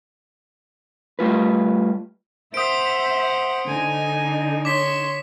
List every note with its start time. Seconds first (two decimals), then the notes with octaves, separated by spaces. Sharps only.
1.19 G3 A3 F4 B4
2.54 C5 E5 F#5 D#6 D7
3.67 D3 D#4 G#5
4.65 C#5 C6 D6 B6